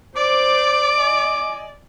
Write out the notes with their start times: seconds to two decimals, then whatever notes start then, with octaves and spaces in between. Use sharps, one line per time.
0.16 C5 D5 D6
0.95 D#5 G#5